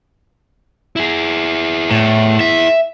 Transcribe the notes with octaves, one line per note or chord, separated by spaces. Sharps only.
E4 G#4
A2
E5